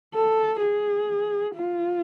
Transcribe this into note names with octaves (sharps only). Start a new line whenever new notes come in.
A4
G#4
F4